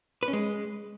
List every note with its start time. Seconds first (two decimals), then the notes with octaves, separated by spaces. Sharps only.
0.23 B4
0.28 C#4
0.33 G#3